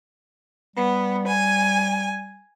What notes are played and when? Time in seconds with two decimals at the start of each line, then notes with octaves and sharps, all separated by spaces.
0.76 G3 B3
1.26 G#5